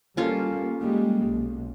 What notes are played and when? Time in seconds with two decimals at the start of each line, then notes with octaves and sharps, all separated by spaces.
0.17 G3 A#3 C#4 F4 A4
0.81 G3 G#3 A#3
1.25 B1